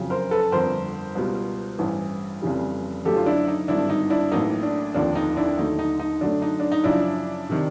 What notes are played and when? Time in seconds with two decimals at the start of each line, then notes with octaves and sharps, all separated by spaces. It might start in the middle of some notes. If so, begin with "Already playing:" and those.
Already playing: F#1 F2 C#3 F#3
0.10 A#4 C5
0.31 A4 B4
0.52 G1 F2 D3 A#4 C5
1.15 C#2 B2 G3
1.79 A1 G2 E3
2.42 F1 F2 C#3 E3 G3
3.05 F#1 F#2 D3 F#3 A3 G4 A4
3.16 F4
3.26 D4 E4
3.47 D#4
3.68 G#1 G2 D3 D4 E4
3.89 D#4
4.10 D4 E4
4.31 A1 A2 F#3 A#3 D#4
4.63 D4
4.94 F1 D#2 D3 F3 D4
5.15 D#4
5.37 D4 E4
5.58 D#2 D3 F#3 A3 D#4
5.79 D#4
5.99 D#4
6.21 F#2 D3 F#3 A3 D4
6.42 D#4
6.60 D4
6.72 D#4
6.84 F#2 C#3 F3 D4 E4
7.49 C3 D#3